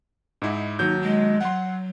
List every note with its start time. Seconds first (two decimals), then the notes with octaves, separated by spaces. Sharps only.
0.42 G#2 D#4 E4
0.79 D#2 F#3 D#4 G6
1.01 G#3
1.41 F#3 F#5 C6